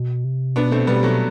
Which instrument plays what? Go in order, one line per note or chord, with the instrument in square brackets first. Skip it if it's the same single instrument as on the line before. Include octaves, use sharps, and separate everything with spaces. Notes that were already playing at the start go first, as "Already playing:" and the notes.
Already playing: [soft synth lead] B2
C3
[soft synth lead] B2 [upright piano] B3 D4
[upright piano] A3 C4
[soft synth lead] B2 [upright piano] G3 B3
[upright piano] F#3 A3